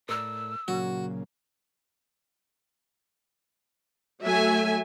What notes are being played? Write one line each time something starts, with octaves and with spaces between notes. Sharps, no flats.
A2 A#4 D5 E6
A#2 C#3 F#3 F#4
F#3 A3 E5 G#5